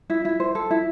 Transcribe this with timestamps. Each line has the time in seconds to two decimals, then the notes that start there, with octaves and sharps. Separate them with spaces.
0.10 E4
0.25 E4
0.40 C5
0.55 A4
0.71 E4